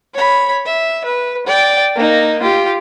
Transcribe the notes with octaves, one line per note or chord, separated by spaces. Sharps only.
C#5 B5
E5
B4
D5 G5
A#3 D#4
F4 G4